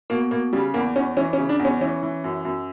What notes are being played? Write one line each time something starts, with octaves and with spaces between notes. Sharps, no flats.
B2 A#3
B2 A#3
C#3 G3
E2 A#3
E2 C#4
E3 C#4
C#4
C#3
D4
E2
C#4
E3 C#4
E3
F#2
F#2